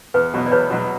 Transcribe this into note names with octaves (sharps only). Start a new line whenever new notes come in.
E2 B4
B2 F#3 B3
D5
E2 B4 C#5
B2 F#3 B3